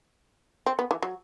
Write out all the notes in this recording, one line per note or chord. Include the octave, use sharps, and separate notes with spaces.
C4
B3
E3
F#3